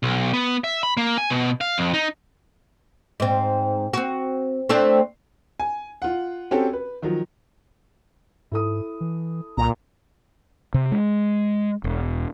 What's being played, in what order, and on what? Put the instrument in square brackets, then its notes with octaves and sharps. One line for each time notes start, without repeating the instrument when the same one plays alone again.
[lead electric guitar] B1
B3
E5
B5
A#3
G#5
B2
F5
F2
D#4
[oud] G#2 C4
C4 F#4
A3 C4 D4
[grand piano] G#5
F4 F#5
C4 C#4 F#4 G4 A4
B4
D#3 F3 F#3
[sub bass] G#2 [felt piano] E4 A4 D#6
[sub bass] E3
[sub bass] C2 [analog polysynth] A#2 [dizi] A#5
[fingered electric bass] C3
G#3
E1